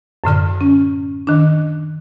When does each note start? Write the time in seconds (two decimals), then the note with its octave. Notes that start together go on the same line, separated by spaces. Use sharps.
0.24 F#2 A2 D3 F6
0.61 C#4
1.27 D#3 D4